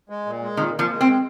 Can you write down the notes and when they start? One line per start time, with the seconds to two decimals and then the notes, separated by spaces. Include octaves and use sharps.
0.09 G#3
0.26 A#2
0.42 G#3
0.57 A#2 D#3
0.74 A#2 F3
0.90 G#3
1.01 C4
1.06 G#3